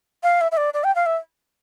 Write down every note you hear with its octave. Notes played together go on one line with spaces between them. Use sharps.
F5
E5
E5
D5
D5
G5
F5
E5